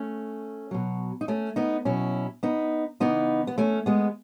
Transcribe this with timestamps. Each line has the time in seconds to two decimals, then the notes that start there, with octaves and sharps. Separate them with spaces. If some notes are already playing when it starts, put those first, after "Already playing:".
Already playing: A3 C#4
0.71 B2 F#3
1.21 D#4
1.28 A3 C#4
1.56 B3 D#4
1.85 B2 F#3 C#4 E4
2.43 B3 D#4
3.00 C#3 E3 B3 D#4
3.47 B3
3.58 A3 C#4
3.86 G#3 B3